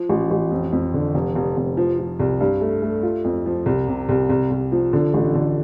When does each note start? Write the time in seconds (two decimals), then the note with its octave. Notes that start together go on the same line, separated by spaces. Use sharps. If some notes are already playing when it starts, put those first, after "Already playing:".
Already playing: F3
0.10 A1
0.31 A1
0.51 F2
0.72 F2
0.94 D3
1.14 F1
1.35 F1
1.57 F1
1.77 F3
1.99 F3
2.20 C2
2.40 G2
2.61 A3
2.82 A3
3.03 F4
3.24 F2
3.46 F3
3.66 C2
3.88 C3
4.09 C2
4.30 C2
4.51 C2
4.72 F3
4.93 D3
5.14 A1
5.35 D3